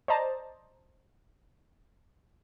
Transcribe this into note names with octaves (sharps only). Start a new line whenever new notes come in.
C5 D5 D#5 A5 A#5